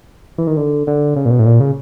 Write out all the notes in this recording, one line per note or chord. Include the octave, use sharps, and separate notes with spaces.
E3
D#3
D3
D3
C#3
A#2
B2
A2
A#2
C#3